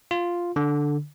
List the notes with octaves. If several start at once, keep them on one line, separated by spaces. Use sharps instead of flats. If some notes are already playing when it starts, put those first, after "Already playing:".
F4
D3